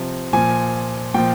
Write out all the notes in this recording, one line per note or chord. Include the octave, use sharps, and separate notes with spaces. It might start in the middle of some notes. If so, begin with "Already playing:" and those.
Already playing: C3 F3
A#2 F3 G#5
A#2 F3 G5